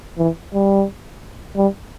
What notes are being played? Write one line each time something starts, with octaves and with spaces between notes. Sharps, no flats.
E3
G3
G3